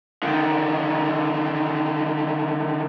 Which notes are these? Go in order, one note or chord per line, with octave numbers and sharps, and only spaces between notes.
D3 D#3